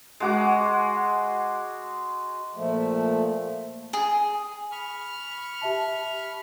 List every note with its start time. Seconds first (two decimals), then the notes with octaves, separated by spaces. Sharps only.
0.20 G#3 F#4 D6
2.55 A#2 F3 A3
3.93 G#4
4.72 B5 C#6 F6
5.62 G4 E5 A5